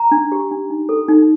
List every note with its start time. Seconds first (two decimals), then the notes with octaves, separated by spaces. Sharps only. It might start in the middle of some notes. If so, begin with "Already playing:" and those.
Already playing: A#5
0.12 D4
0.32 G4
0.51 D4
0.70 D#4
0.89 A4
1.08 D#4